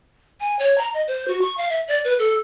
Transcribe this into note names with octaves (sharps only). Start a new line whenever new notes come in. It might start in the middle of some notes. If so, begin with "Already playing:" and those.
G#5
C#5
A#5
D#5
C5
F#4
C#6
F5
E5
D5
B4
A4